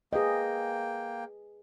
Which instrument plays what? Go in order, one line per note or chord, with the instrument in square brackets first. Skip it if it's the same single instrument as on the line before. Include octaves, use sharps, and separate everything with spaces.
[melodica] A#3 G5 [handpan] G#4 B4 D#5